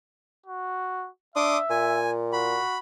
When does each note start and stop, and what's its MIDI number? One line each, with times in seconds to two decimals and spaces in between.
0.46 1.09 66
1.36 1.59 62
1.36 2.00 76
1.36 1.57 84
1.36 1.57 86
1.36 1.57 87
1.70 2.60 46
1.70 2.10 80
2.33 2.78 66
2.33 2.78 83